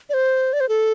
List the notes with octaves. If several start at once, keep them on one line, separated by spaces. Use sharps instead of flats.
D5
C5
D5
C5
A4